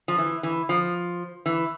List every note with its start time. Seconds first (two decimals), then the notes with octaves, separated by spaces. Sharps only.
0.08 F3
0.18 E3
0.43 E3
0.69 F3
1.46 E3